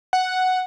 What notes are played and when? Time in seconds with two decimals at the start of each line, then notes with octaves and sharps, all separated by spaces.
0.13 F#5